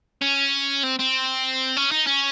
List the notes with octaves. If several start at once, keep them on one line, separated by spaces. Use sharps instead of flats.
C#4
C4
C4
C#4
D#4
C#4